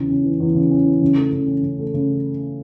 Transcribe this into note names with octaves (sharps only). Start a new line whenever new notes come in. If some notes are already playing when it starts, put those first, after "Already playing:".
Already playing: E2 C#3
C#4
E3
E2
C#3
C#4
E3
C#3
A3
C#3
C#4
C#3
A3
C#3